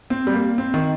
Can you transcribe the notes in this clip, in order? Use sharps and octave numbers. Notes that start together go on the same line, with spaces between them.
C4
G3
A#3
C4
D#3